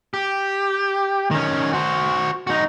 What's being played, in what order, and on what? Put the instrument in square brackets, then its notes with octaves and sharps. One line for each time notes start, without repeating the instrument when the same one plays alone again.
[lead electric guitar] G4
D#3 C#4
F#4 C5
D#4 F#4